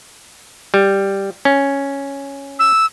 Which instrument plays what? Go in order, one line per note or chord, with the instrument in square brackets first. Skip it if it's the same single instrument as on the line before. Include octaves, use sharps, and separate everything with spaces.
[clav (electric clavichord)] G3
C#4
[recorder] E6